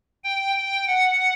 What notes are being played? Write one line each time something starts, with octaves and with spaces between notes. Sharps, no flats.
G5
G5
F#5